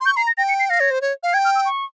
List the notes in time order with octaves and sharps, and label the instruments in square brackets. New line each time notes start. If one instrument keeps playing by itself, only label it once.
[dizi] C6
[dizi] C#6 [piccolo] G6
[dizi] A#5 [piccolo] C7
[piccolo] A#6
[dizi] G5 [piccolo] A#6
[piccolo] C#7
C7
[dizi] F5 [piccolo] A#6
[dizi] C#5
C5
C#5
F5
[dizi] G5 [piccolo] G#6
[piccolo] F6
E6
C#6